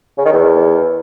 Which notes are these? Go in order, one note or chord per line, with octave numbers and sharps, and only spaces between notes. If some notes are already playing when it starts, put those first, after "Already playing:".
C#3
D#3
E2